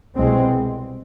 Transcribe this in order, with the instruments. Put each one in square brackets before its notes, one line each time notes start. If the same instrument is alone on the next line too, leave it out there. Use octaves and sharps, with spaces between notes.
[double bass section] C2 B2 G#3 C4